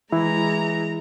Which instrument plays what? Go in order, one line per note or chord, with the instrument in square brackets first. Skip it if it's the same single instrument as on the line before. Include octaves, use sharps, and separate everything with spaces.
[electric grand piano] E3 [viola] G#3 A#5 [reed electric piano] E4